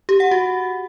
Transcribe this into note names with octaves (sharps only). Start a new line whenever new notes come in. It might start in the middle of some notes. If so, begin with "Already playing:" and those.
G4
F#5
F#4